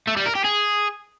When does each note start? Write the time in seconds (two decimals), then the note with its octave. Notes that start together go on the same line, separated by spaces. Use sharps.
0.08 A3
0.17 G3
0.26 A#4
0.35 G4
0.45 G#4